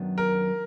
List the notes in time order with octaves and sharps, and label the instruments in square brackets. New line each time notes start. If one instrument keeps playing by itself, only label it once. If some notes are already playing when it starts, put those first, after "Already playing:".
Already playing: [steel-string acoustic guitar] F#2 D#3 F#3 B3 D4
[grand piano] A#4